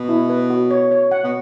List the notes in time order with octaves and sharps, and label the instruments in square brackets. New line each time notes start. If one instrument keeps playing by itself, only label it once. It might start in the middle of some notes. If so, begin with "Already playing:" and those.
Already playing: [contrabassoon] B2
[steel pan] E4
B4
F#4
C#5
C#5
F#5
[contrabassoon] B2